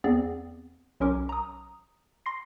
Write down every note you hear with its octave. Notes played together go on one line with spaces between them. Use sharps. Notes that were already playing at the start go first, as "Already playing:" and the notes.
E2 B3 C4 G#4 D5
B1 F#3 C#4 A#4 C6 D6
A#5 D#6
C6 A#6 C7